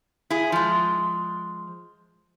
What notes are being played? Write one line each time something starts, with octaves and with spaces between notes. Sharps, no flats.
E4 G#4
F3 G#3